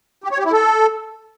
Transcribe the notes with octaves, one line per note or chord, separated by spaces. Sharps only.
G4
C#5
G4
E4
A4